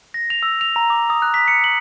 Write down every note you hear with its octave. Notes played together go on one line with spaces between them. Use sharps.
A#6
F7
E6
F7
A#5
D6
D#6
F#6
B6
C#7
F#7